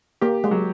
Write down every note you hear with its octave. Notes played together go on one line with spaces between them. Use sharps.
A#3 G4
G#3
F#3